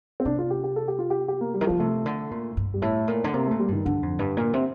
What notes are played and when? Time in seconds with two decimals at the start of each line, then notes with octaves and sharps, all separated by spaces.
0.20 C4
0.25 C3 D4
0.39 F4
0.50 G4
0.64 G4
0.76 A4
0.88 G4
0.99 F4
1.10 G4
1.28 G4
1.41 A#3
1.54 G3
1.61 D#3
1.67 D3 F3
1.79 C3 A3
2.06 D3
2.31 A#2
2.57 G2
2.74 G3
2.82 A2 A3
3.08 A#2
3.24 D3
3.34 C3 A#3
3.46 A3
3.51 A#2
3.59 G3
3.68 G2 D#3
3.85 G2 D3
4.03 F2
4.19 G2
4.37 A#2
4.54 C3